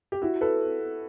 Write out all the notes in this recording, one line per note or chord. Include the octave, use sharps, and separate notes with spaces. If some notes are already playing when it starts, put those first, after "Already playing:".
G4
E4 F#4
A4 B4